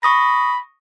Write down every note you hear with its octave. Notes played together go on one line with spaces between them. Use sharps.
B5 C#6 D#6 A#6